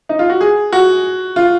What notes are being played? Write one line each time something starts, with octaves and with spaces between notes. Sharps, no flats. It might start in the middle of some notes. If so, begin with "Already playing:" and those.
D#4
F4
F#4
G#4
F#4
F4